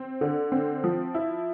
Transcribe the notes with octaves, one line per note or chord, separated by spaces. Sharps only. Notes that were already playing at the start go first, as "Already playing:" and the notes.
Already playing: C4
D3
C4
F3
E4